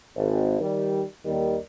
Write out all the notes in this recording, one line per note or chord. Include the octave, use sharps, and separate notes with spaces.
G#1
D#3 G3
D#2 D#3 G3